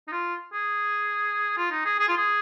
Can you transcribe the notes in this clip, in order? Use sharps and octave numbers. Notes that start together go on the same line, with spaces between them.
D#4
F4
G#4
F4
D#4
G#4
G#4
F4
G#4